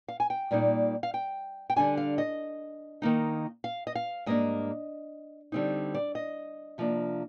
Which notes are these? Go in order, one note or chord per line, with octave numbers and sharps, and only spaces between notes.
F5
G#5
G5
A#2 G3 A#3 D#4
F5
G5
G5
D3 G3 D4 G#5
F5
D#5
D#3 A#3 D#4
F5
D#5
F5
G#2 G3 A#3 D4 D#5
D3 G3 C4 D#4
D5
D#5
C3 F3 A#3 D4